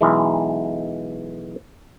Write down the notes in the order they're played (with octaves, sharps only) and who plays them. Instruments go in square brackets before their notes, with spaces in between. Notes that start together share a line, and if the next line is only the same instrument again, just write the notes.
[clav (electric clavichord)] B1 E3 G#3